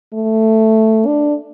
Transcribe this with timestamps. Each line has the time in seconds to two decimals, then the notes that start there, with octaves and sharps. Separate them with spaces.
0.14 A3
1.06 D4